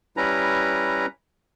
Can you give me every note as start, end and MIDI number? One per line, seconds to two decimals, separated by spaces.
0.17 1.06 55
0.17 1.06 61
0.17 1.06 64
0.17 1.06 71
0.17 1.06 82